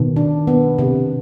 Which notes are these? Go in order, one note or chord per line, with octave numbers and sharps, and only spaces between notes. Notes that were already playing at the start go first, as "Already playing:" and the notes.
Already playing: B2 D#3
D4
B3
C3